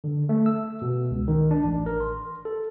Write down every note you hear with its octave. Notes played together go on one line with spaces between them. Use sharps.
D3
A3
E6
B2
C#2
D#3
D4
A1
A#4
C6
A4